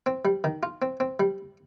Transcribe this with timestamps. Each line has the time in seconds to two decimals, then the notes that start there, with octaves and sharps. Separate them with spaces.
0.06 C4
0.25 G3
0.44 D#3
0.63 F4
0.82 C4
1.00 C4
1.20 G3